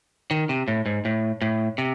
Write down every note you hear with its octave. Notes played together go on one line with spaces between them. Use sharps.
D#3
C3
A2
G#2
A2
A2
C3